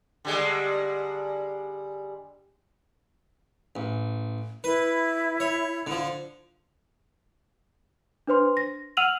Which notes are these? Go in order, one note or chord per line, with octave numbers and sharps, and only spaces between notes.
D3 G3 G#3
A1
E4 B4
C#5
D3 F3
D4 B4 C5 C6
A#6
F#5 E6 F6 D#7 F7 F#7